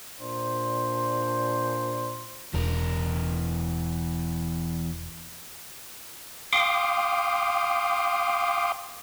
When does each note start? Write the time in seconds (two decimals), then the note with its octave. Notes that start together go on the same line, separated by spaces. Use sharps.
0.20 A#2 D4 C5
2.54 E1 E2 A#4
6.53 F5 G5 C6 D6 D#6